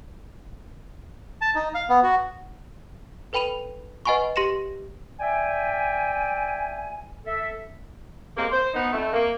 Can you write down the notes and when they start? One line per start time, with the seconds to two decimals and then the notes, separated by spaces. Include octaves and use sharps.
1.41 A5
1.55 D#4
1.75 F5
1.89 B3
2.03 F#4
3.33 A4 B4 G5 B5 D#7 F7
4.05 B4 D#5 F#5 G#5 B5 C#6
4.36 G4 C6 A#6 C#7 E7
5.20 D5 E5 G5 G#5
7.26 A4 E5
8.37 C3 G#3 A#3
8.52 C5
8.74 B3 D#4
8.93 F2 A3
9.13 A#3